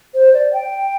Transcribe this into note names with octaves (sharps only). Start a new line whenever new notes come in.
C5
D5
G5